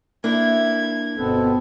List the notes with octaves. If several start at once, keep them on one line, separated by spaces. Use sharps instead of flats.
A#3 D4 E4 G#6
G1 B2 B3 C4 A4